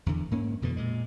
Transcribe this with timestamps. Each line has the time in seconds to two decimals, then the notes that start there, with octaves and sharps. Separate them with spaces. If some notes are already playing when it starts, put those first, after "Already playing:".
0.06 E2 D3
0.31 G#2 A#3 C#4
0.62 F2 B2 D3 E3
0.77 A#2 G#3